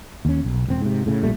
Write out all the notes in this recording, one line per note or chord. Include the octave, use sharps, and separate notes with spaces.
D#2 C#4
B1
E1 C4
G#2 C3
A2 C#3
A#1 A#2 G3 A3